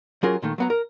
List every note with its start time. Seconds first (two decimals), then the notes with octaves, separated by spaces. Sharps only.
0.23 F#3 C#4 F4 G#4 A#4
0.42 A#2 D#3 A3
0.58 F#3 B3 A#5
0.70 A#4